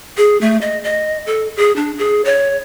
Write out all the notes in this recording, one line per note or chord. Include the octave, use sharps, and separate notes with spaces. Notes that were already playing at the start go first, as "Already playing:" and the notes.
G#4
A3
D#5
D#5
A4
G#4
D4
G#4
C#5